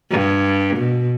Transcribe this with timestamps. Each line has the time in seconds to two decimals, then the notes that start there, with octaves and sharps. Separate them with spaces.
0.11 G2
0.77 B2